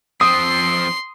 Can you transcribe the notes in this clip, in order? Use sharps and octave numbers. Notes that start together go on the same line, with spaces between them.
F3 C4 C6 D#6